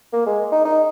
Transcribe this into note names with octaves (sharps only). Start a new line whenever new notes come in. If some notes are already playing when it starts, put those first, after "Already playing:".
A#3
G#3
D#4
D#4